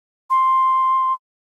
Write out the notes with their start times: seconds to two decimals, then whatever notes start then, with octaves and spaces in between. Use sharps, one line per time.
0.30 C6